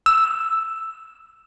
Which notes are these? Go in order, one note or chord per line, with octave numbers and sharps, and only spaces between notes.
E6